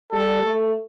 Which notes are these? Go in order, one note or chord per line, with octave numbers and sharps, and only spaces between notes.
G3 A4
A3